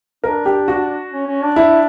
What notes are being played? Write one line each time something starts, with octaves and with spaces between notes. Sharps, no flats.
D4 A#4
G4
F#4
C#4
C#4
D4
E4